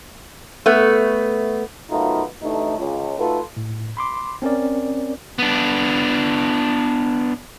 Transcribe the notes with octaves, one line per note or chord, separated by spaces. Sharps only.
A3 B3
F#2 A3 B3 D#4 F4
A1 A2 A3 D4 D#4
C#2
A3 D#4 F4 F#4 A4 B4
A2
B5 C6 D6
C4 C#4 A#4 D5
B3 D4